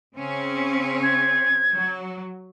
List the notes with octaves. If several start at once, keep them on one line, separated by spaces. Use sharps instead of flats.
C#3 C4 C#4
G#6
F#3